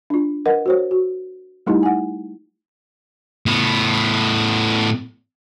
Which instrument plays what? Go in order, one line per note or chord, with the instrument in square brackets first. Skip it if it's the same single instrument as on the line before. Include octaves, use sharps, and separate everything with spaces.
[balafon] D4 F4
A#4 B4 D#5 F#5
F#4 C5 C#5
F#4
G3 A3 D#4 E4 G4 D#5
F#5 G#5
[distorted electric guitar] A2 B3